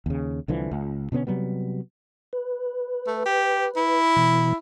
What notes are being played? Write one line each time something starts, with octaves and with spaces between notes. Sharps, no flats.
D#2 C#3
C2 D3 E3 F3
C#2
B2 D3 B3 C#4
C3 F#3 G3 B3
B4
A3
G4
E4
B2 E3